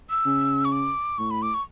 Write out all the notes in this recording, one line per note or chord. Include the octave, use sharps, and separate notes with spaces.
E6
C#3
C#6
D6
A2 C#6
B5
D6
C#6